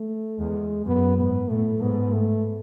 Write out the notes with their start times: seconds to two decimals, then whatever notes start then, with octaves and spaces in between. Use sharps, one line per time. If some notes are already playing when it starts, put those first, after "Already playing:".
Already playing: A3
0.38 E2 G#3
0.86 F#2 B3
1.18 G#2 B3
1.49 A2 A3
1.80 G#2 B3
2.12 A3